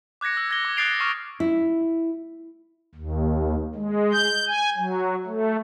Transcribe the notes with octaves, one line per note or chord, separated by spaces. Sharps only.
D6 F#6 G#6 A#6 C#7
E6
G#6 A#6 G7
D6
D#6 F#6 A6 C7 D7 F7
C#6 D#6 F6
E4
D#2
G#3
G6
G#5
F#3
A3